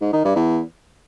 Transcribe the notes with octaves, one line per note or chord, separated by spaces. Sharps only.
G#2
D#3
G2
E2